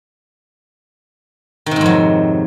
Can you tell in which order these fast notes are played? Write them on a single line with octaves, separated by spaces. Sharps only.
D#3 C3 G#2 F2 F#3